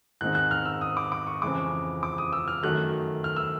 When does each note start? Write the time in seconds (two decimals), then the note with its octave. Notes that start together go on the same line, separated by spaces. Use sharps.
0.21 G#2 D#3 G#3 C4 D#4 F#6
0.35 F#6
0.51 F6
0.65 E6
0.81 D#6
0.97 D6
1.12 D6
1.27 C#6
1.42 F2 C#3 E3 G#3 D6
2.03 D6
2.18 D#6
2.33 E6
2.48 F6
2.63 F#2 D#3 F#3 A3 F#6
3.24 F6
3.36 E6